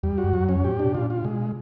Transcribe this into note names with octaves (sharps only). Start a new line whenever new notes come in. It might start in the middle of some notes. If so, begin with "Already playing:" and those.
E2 G3
F#4
F#2
F2 F#3
F2 C#4
A2 G4
B2 D4
A#2 F4
F4
B2 G#3